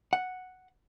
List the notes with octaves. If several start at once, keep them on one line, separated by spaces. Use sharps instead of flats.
F#5